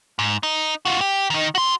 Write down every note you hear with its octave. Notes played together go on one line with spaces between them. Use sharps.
G#2
D#4
F4 F#4
G4
D#3 D#4
F#4 C6